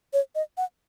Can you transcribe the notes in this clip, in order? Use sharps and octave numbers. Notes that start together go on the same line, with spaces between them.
C#5
D#5
F#5